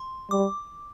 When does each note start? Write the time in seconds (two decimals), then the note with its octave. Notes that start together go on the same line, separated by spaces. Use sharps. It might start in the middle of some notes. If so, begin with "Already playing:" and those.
Already playing: C6
0.31 G3 D6